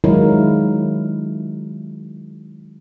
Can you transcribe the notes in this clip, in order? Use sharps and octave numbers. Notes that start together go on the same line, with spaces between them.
D#3 F#3 G#3 E4 F4 A#4